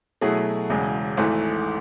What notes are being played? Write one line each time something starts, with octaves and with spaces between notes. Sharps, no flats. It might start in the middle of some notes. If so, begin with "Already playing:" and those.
B2 F#3 A3 E4 G#4
E1 E2 C#3 G#3
G#1 G#2 E3 A3 E4